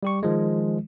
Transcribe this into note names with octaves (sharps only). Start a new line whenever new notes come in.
G3 G4 C#6
D#3 F3 G#3